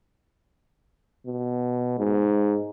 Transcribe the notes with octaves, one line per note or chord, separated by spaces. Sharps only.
B2
G#2